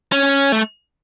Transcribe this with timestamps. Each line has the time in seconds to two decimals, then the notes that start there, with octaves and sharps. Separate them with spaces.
0.12 C#4
0.52 A3